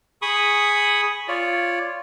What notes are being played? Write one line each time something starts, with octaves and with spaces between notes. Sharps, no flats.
G#4 B5 C#6 D#6
F4 C#5 D5